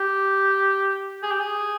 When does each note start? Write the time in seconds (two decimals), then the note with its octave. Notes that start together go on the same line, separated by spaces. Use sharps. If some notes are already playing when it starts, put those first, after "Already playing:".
Already playing: G4
1.23 G#4
1.31 G4
1.40 G#4